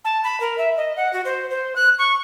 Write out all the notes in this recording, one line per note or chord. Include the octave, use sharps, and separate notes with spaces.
A5
B5
A#4
E5
D#5
F#5
F#4
C5
C5
F#6
C#6